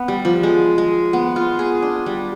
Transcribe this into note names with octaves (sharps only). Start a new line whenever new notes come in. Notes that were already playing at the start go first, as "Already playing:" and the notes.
Already playing: B3
G3
F3
G#3
G#3
B3
F4
G#4
D4
G3